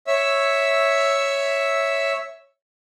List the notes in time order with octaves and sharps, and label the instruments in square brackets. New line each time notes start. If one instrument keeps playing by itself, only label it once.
[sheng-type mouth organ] C#5 E5 E6